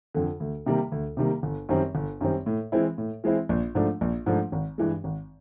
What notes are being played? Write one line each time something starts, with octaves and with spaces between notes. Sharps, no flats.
F2 D3
D2
C3 D#3 G3 A#3
D2
C3 D#3 G3 A#3
G1
F#2 D#3 G3 C4
G1
F#2 D#3 G3 C4
A2
E3 G#3 C4 E4
A2
E3 G#3 C4 E4
A#1
G#2 F3 A3 D4
A#1
G#2 F3 A3 D4
G#1
G2 E3 G#3
G#1